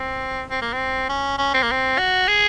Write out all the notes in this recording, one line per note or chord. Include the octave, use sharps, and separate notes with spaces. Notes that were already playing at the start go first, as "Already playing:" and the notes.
Already playing: C4
C4
A#3
C4
C#4
C#4
C4
A#3
C4
F#4
G#4